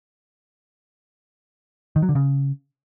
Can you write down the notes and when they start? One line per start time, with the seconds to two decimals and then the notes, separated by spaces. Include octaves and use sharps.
1.96 D#3
2.02 F#3
2.09 D3
2.15 C#3